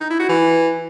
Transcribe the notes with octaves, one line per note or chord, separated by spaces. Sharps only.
D#4
E4
F#4
E3